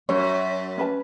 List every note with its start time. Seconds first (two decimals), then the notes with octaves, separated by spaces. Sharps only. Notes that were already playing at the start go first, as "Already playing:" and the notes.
0.09 F#2 C#5
0.77 C#4 B4 A5